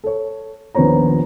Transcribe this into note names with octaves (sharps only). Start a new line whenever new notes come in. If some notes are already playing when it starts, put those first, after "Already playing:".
A4 C#5
D#1 A#1 B3 C5 C#5 A#5